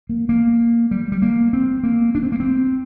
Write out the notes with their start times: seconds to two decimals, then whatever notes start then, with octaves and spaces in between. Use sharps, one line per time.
0.09 A#3
0.29 A#3
0.91 G3
1.12 G3
1.22 A#3
1.53 C4
1.83 A#3
2.15 D4
2.23 C4
2.32 A#3
2.40 C4